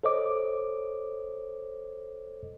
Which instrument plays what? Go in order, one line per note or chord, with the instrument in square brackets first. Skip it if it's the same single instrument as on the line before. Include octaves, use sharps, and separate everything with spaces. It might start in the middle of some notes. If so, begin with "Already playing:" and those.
[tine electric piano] A4 C5 C#5 D#5 D6